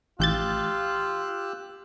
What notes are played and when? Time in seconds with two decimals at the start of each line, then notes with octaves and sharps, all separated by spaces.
0.20 A1 F4 G4 E6 F#6 G6 A6